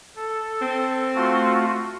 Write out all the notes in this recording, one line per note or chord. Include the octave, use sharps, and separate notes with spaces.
A4
C4
A3 F4 F#4